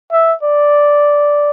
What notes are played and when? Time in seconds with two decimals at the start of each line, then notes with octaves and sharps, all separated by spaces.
0.12 E5
0.43 D5